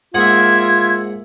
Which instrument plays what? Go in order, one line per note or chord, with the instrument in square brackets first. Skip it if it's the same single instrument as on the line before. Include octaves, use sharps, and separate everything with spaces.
[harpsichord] G#2 F#5 D#6 [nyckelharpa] A#3 E5 [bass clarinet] F4 [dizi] G#6